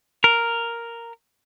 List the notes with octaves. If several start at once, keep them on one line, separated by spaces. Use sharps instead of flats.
A#4